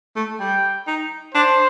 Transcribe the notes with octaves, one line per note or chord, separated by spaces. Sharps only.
A3
G3 G5
D#4
D4 C5